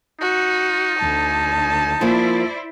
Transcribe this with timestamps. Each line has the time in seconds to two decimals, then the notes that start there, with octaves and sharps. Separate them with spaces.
0.21 D#4 F#4
0.99 D2 A5
2.01 F3 A#3 E4 C5 D5